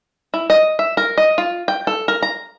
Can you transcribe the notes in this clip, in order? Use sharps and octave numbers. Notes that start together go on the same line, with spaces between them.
E4
D#5
E5
A#4
D#5
F4
G5
A4
A#4
A#5